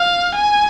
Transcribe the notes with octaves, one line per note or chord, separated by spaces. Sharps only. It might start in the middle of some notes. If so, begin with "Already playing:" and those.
Already playing: F5
G#5